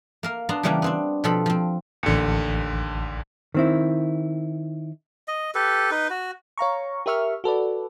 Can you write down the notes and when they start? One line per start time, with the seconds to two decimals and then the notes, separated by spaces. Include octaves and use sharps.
0.23 A#3 A#4 F5
0.49 B3 D4 A5 A#5 C6
0.63 C#3 E3 G3 A#3 C#4 D4
0.82 B3 C4 D4
1.24 B2 F3 C4 A4 C5 B5
1.46 F3 C4
2.03 A1 D#2 D3 C#7
3.54 D#3 C4 E4
5.28 D#5
5.55 G4 A4 B4
5.91 D#4 B4
6.10 F#4
6.58 C#5 F5 A#5 C#6
7.06 G4 A#4 E5 C#6 F6
7.44 F#4 A4 B4 D5